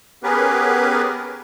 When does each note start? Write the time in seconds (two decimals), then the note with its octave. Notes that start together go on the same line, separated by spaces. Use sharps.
0.23 B3 C#4 G4 G#4 A#4 B4